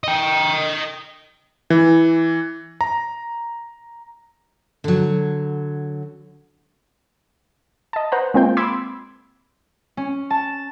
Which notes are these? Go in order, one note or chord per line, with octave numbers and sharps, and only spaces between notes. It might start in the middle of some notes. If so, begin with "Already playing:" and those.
D#5 G5
E3
A#5
D3 F#3
D#5 A5
B4 C5 F#5 A#5
G#3 A#3 C4 F4 G5
B5 C6 D6 E6 G#6
C#4
A5